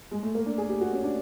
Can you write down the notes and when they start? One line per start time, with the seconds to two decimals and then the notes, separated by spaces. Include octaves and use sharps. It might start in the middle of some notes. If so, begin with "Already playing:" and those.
0.11 G#3
0.23 A3
0.35 A#3
0.46 D4
0.58 G#4
0.69 G4
0.81 F#4
0.92 C#4
1.04 D4